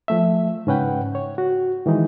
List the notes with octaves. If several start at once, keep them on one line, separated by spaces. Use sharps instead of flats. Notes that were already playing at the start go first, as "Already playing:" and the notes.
F3 A3 E5
G#2 C#3 C#4 B4 F#5 G5
C#5
F#4
D#3 E3 G#3 D#4